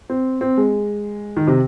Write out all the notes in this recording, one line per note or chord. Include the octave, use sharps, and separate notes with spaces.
C4
C4
G#3
D#3
C3